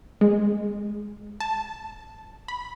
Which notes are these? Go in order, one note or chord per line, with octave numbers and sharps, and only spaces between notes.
G#3
A5
B5